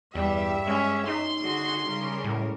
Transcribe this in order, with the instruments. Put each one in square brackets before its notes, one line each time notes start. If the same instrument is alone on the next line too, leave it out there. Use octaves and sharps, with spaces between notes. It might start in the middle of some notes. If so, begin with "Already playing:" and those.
[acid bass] E2 [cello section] G2 E5 [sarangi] G3
[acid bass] G#3 [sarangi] C#4
[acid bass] D#4 [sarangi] C6
[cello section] D3 F#4 G#4
C#3 G3 A#4
[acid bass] A2